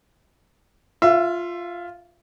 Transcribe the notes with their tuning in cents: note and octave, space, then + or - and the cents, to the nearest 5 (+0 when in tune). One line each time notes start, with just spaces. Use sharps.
F4 +0 E5 +25